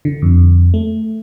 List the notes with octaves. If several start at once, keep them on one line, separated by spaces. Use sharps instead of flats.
D3
F2
A3